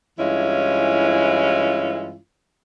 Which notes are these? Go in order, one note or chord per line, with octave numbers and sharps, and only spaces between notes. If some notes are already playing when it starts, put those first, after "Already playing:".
G2 E3 G#3 C#4 E4 F4